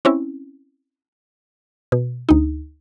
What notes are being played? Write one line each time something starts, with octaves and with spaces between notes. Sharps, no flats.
C4 C#4 E4
B2
D2 D#4